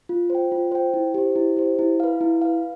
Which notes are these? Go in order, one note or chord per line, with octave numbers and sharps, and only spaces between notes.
F4
C5 G5
F4
C5 G5
E4
G4 C5
E4
G4 C5
E4
B4 F5
E4
B4 F5